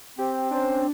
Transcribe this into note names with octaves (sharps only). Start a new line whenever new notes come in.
C4 G4
C#4 D4 C5